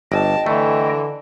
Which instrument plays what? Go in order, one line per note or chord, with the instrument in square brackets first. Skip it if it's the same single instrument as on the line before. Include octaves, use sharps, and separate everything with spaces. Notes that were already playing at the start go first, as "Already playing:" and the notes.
[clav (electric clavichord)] G1 [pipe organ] D#5 G5 [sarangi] A5
[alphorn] D3 [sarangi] E3 [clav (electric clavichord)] A3